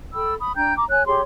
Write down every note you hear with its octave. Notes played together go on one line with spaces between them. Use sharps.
A4 G5 B5 E6
B5 D#6
D4 G5 A#5 G6
A#5 D6
C#5 G#5 F#6
G4 G#4 C#5 C6